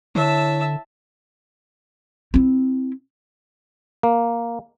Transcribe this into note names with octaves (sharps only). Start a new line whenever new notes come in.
D3 E4 C#5 E5 A5
C4 E4
A#3